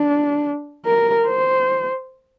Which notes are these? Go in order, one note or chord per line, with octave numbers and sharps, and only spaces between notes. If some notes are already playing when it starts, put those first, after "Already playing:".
Already playing: D4
A#4
C5